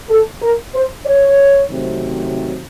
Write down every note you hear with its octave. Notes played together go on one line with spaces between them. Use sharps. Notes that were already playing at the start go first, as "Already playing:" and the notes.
A4
A#4
C5
C#5
C3 D#3 F#3 A3 C4